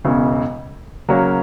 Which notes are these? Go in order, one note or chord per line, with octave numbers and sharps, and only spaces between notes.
E1 E2 C#3
C#3 F#3 A#3 C#4